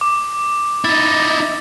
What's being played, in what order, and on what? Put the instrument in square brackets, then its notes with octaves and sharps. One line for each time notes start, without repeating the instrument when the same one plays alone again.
[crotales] D6
[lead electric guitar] D#4 E4 [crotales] A6